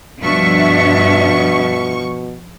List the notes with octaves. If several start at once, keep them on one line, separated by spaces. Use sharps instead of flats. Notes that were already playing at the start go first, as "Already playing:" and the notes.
G2 B2 F3 D4 E5 C#6